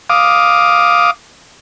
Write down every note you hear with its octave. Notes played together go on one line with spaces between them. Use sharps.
F5 D6 D#6